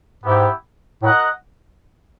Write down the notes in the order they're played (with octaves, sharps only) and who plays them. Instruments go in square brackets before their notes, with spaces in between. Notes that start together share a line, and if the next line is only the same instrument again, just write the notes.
[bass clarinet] G#2 [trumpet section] B3 E4 G4
[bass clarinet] A2 [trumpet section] F#4 A#4 D#5 F#5